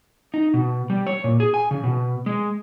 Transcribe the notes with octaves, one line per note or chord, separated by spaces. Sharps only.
D#4
B2
G3
C#5
A#2
G#4
G#5
C#3
B2
G#3